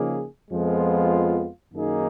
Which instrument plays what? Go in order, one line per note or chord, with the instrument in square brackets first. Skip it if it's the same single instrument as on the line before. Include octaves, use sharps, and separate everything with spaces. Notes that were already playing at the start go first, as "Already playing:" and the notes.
Already playing: [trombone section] C#3 F3 A#3 D#4 G#4
F2 F3 G#3 B3 F4
F#2 D#3 A#3 D#4 G#4